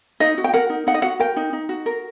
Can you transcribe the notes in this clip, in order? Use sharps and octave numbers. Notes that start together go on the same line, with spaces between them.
D#4 D#5
F#4
G5
A#4 F#5
D#4
D#4 F#5
D#5
F#4 F#5
A#4 G5
D#4
D#4
F#4
A#4